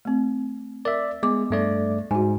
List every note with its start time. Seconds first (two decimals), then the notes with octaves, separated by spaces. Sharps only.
0.05 A3 C4
0.85 A#4 D5 E5
1.23 G#3 B3 D6
1.50 G2 A3 D5
2.11 G#2 F#4 G#5